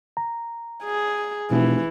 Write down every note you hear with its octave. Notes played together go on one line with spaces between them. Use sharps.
A#5
G#4
F1 B2 E3